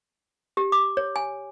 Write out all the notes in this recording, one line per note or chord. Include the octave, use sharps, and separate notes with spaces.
G4
D6
C#5
G#5